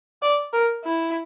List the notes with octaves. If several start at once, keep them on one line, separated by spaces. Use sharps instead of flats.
D5
A#4
E4